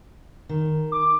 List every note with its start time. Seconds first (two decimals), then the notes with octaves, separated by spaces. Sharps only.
0.49 D#3
0.92 D6